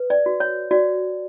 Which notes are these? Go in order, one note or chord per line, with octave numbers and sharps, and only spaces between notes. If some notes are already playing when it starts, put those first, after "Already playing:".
Already playing: B4
D5
F#4
C#5
F#4 D5